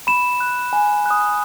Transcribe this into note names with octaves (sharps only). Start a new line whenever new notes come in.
B5 E7
F#6
G#5
D#6 F#6